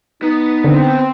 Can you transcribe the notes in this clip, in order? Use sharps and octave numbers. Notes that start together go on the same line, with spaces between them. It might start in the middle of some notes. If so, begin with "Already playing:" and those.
B3 D#4
D3 C4